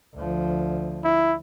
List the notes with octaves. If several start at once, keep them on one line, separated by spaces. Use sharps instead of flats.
D2 F3
E4